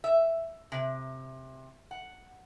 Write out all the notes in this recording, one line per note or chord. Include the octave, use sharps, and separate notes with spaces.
E5
C3
F#5